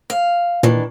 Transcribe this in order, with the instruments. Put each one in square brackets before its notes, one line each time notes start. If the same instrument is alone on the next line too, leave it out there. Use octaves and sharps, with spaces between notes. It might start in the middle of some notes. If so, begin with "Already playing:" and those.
[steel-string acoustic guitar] F5
[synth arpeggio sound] A#2 [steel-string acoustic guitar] D#3 E3 D4